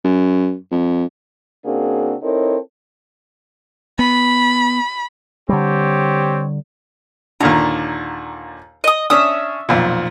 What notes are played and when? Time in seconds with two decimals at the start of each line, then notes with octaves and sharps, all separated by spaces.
0.04 F#2
0.71 F2
1.65 C#3 A#3 C4 D4 F#4 G#4
2.23 C4 D#4 E4 A4 A#4 C#5
3.99 B3 B5
5.49 D3 G3 C4 G4 C#5
7.41 D#2 A#2 D3 A#5
8.84 D#5 D#6
9.10 C#4 D4 E5 D#6
9.69 B1 F2 A#2